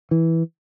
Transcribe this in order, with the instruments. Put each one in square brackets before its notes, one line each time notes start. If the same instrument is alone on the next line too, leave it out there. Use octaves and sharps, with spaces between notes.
[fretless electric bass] E3